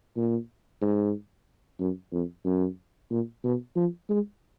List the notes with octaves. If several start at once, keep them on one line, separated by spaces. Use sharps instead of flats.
A#2
G#2
F#2
F2
F#2
A#2
B2
F3
G#3